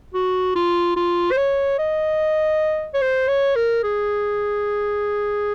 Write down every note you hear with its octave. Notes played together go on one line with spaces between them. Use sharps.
F#4
F4
F4
C5
C#5
D#5
C#5
C5
C#5
A#4
G#4